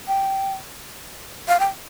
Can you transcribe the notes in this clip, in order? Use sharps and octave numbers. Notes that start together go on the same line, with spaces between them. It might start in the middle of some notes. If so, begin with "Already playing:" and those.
G5
F5
G5